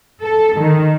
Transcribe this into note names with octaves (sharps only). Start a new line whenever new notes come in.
A4
D#3